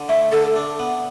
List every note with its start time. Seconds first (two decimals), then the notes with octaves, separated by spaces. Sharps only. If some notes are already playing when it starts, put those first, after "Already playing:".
Already playing: D3
0.09 A3 E5
0.32 D3 A4
0.56 D4
0.79 B3